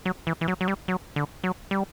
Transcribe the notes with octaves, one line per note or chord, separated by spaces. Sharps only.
F#3
E3
E3
F#3
F#3
G3
F#3
D3
F#3
G3